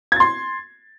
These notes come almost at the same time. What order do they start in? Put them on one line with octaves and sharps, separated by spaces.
G#6 A6 C6